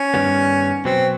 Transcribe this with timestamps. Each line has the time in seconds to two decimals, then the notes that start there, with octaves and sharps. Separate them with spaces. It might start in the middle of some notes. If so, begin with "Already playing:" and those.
Already playing: C#4
0.14 G2 D#3 G3 B3
0.85 B2 F#3 B3 C4